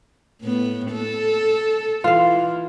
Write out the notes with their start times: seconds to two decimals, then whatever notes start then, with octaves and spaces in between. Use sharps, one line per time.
0.41 A2 B3
0.92 A4
2.04 E3 F4 F5